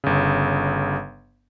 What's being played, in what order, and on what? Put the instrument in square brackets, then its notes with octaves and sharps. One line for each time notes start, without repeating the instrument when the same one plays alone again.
[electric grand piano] G1 C#3